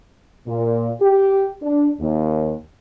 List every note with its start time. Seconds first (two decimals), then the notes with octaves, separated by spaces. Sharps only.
0.47 A#2
1.01 G4
1.62 D4
2.00 D#2